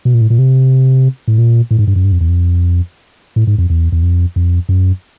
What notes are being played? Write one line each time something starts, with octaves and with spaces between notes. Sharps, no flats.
B2
A#2
A2
A#2
C3
A2
A#2
A2
G#2
G2
F#2
G2
F2
E2
F2
A2
G#2
F2
E2
E2
F2
F2
F#2